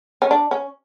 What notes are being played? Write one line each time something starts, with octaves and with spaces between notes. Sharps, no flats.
C#4
D4
C#4